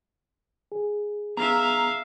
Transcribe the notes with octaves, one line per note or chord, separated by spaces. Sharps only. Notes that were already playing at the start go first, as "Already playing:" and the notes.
G#4
B3 G#4 E5 F5 A#5